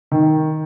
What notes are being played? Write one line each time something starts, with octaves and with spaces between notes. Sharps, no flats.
D#3